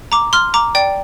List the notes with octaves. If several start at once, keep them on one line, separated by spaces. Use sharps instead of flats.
A#5 D6
C6 F6
A#5 D6
D5 G5